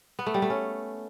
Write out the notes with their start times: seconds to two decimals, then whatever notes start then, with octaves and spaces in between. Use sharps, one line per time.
0.19 B3
0.26 A3
0.34 G3
0.42 A3
0.50 C#4